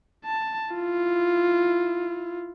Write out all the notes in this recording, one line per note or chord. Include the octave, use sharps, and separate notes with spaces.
A5
E4 F4